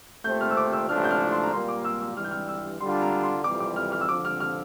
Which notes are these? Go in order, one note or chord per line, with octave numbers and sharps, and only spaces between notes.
A#2 A3 C4 G4 C5 G6
F6
E6
D6
E6
A1 A2 F3 A3 D4 F6
G6
F6
C6
A#5
A#2 G3 A#3 C6
D6
E6
E6
G2 E3 G3 F6
G6
F6
E6
D3 G3 D4 F4 C6
A#5
C6
F2 E3 G3 D6
D6
F6
F6
E6
F2 D3 F3 D6
F6
F6